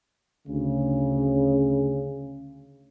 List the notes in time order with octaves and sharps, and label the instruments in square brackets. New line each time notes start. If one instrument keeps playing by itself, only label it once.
[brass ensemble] D2 C#3